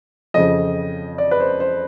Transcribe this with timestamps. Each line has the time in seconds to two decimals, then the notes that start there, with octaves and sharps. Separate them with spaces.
0.34 F2 C#3 F3 D#5
1.18 D5
1.31 B4
1.40 C5
1.60 C5